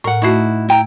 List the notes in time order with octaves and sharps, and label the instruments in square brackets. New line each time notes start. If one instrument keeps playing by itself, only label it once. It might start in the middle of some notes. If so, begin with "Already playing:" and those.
[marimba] A2 [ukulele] A#4 F#5
[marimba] A3 C#6 [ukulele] D#4 E4 F#4
[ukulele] E4 G5 A#5